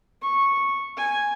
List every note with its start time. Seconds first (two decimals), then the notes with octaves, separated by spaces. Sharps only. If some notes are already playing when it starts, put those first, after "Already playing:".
0.22 C#6
0.97 G#5